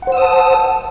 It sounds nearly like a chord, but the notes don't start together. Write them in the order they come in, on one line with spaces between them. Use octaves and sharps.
F#5 C5 E6 D#6 A5